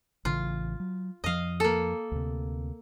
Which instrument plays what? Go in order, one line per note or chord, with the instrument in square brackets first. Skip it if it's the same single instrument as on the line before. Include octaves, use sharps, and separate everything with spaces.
[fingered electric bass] A1 C#3 E3 [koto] F4
[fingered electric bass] F#3
[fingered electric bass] F2 F3 [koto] D#5 F5
[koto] A#3 A4
[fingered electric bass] D2 C3